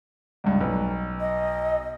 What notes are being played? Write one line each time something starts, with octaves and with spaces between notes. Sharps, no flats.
C#2 G2
B1 B4
D#5